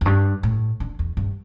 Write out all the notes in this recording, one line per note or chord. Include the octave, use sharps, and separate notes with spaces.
E2
G2
A2
D3
E2
G2